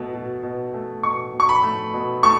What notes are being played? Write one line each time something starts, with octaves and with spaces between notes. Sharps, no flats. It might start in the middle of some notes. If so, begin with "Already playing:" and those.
Already playing: B2 A3
B2
B2
A3
B2 C#6
B2
C#6
B5
A3
B2
A3 C#6